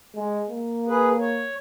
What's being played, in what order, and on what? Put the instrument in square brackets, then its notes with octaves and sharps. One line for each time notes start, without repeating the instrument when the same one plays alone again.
[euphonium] G#3
A#3
[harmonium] G#4 B4
C#5